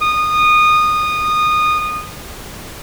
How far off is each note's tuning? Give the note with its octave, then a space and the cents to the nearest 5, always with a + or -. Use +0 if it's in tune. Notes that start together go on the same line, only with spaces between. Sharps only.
D#6 -20